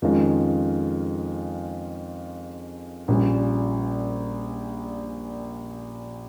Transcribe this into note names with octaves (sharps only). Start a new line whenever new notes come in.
F2 D#3 G#3 C#4 F4
A#1 A#2 G3 C#4